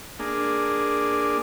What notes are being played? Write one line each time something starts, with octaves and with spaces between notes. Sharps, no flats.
A#3 D4 G#4